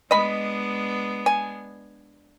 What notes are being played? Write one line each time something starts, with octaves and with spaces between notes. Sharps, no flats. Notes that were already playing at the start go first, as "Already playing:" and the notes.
G#3 B3 D4 D#5 B5
G#5